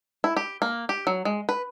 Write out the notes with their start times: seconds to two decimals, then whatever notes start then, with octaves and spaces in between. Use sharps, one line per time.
0.24 E4
0.37 G4
0.62 A#3
0.89 G4
1.07 F#3
1.25 G#3
1.49 B4